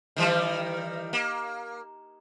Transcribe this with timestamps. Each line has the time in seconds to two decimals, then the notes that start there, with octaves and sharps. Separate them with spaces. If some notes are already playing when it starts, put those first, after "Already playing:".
0.16 D#3 E3 G3
1.13 A#3